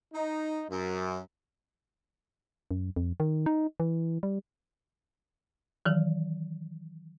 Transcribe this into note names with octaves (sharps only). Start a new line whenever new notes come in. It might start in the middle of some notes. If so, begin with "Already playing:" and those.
D#4
F#2
F#2
F2
D#3
D#4
E3
G3
D#3 E3 F#3